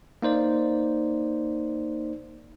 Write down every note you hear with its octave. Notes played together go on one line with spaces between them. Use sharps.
A#3 D#4 C5 D5